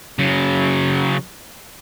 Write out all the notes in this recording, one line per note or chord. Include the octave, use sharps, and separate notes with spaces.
C#3 F#3